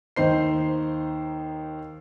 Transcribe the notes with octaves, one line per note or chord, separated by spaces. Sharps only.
D#2 D#4 C5 C7